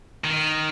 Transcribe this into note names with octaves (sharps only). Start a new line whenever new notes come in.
D#3